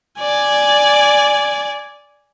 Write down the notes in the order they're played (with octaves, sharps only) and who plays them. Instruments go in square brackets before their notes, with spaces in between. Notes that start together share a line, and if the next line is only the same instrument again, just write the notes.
[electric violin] D5 G#5